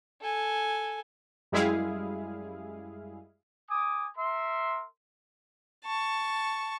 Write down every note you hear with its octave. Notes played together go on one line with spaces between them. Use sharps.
A4 G#5
F#2 G3 G#3 E4 G#4 F5
G#5 D6 D#6
A#4 E5 C6
A5 C#6